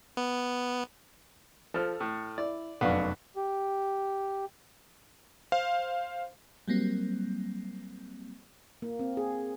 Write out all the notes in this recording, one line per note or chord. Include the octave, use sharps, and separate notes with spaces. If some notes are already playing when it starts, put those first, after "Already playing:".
B3
F3 A4 F6
A2
E4 D5
F1 F#2 B3 D4 F#4 F5
G4
C5 F5
F#3 G3 A#3 C4
A#3
C4
G#4